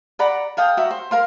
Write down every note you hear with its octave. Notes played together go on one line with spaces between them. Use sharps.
D5 F#5 A#5 B5
A4 F5 G5 D#6
F#4 E5 A#5
C5
A#4 F5 C6